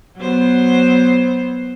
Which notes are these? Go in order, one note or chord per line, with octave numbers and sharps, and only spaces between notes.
F#3 B3 C5